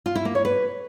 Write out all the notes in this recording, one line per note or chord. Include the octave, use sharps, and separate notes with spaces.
F4
E4
A#3
C#5
B4